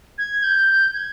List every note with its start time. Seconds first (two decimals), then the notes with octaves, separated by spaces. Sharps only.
0.18 G#6
0.43 G6
0.94 G#6